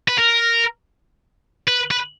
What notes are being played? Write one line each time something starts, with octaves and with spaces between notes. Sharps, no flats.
B4
A#4
B4
B4